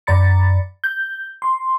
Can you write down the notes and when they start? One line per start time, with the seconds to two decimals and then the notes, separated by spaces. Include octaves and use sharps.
0.07 F#2 D5 A#5 B5 A6 C#7
0.84 G6
1.42 C6